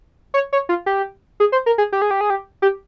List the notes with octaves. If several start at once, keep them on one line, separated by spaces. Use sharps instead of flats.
C#5
C#5
F4
G4
G#4
C5
A#4
G#4
G4
G#4
G4
G#4
G4
G4